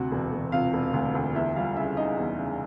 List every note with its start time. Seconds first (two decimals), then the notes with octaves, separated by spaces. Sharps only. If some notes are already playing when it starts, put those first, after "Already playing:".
Already playing: D2 C3 F#4 F#5
0.12 E1
0.33 E1
0.52 C3 F4 F5
0.73 E1
0.94 D2
1.15 D2
1.35 E2 E4 E5
1.56 G3 F4 F5
1.76 C#3 E4 E5
1.97 C#3 D#4 D#5
2.17 E2
2.38 C#3